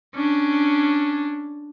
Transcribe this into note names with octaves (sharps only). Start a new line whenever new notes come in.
C#4 D4